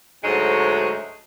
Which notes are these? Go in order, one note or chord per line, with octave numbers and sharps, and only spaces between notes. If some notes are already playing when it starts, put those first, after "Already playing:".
D2 G#2 F#3 G#3 A3